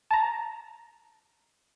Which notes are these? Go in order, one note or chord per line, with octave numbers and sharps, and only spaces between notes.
A5 A#5